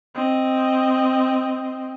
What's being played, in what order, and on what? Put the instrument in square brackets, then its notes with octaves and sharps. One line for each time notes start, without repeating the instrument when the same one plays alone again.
[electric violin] C4 D#5